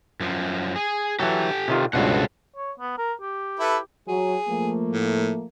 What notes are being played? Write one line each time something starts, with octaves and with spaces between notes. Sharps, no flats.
F#2 F3
G#4
E3 F#3 G4 A4
C3 D#3 F4
C#2 G2 B2 A4 C5 F#5
C#5
B3
A#4
G4
E4 A4 B4
F#3 G#4
F3 A3 A#3
A2